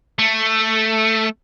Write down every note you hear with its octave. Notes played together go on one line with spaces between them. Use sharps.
A3